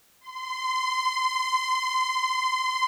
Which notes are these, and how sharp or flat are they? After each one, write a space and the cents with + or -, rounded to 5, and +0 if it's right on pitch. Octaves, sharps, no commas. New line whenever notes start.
C6 -25